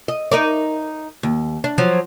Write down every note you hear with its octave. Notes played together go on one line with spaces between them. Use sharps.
D#5
D#4 A#4 D5
D#2
D4
F3 F#3